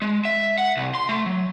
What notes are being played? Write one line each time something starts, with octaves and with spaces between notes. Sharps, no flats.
G#3
E5
F#5
C2
C6
A3
F#3